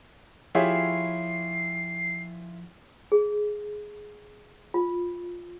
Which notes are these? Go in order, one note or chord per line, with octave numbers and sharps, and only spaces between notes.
F3 E4 F4 G4 G#4 C#5 E5 C7
G#4
F4